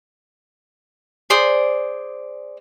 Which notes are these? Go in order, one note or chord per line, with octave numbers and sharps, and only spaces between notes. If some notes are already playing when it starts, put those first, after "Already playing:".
G#4 C5 D5 D#6